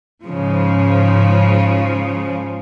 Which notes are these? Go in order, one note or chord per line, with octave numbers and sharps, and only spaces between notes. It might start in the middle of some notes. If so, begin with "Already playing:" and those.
G#2 C#3 F3